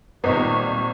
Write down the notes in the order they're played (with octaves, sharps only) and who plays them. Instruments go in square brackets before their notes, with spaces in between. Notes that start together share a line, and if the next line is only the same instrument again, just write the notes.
[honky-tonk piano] G#1 [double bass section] A#2 G3 [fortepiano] B3 D#4 [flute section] C#6